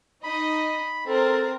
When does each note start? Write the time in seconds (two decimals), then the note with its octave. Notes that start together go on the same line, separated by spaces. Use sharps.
0.24 D#4 D#5 B5
1.07 C4 A4 A#4